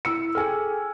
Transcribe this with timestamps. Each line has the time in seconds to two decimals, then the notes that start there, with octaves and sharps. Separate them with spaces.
0.05 E4 E6 C#7
0.35 G#4 A4 G5 G#5 F6